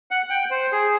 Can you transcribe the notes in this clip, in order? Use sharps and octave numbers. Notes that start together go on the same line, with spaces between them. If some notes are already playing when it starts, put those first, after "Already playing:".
F#5
G5
C5
G#4